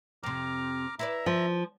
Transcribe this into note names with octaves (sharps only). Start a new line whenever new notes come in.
F2 C3 A#5 D6 F6
E4 B4 D5 E5 A#5
F3